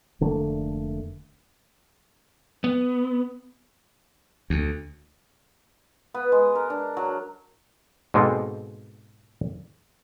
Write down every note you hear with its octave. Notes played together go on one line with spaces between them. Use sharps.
F1 D3 A3 A#3
B3
D2
B3
G#3
A#4
D4
F#3
G#2 B2 G#3 A#3 C4 A4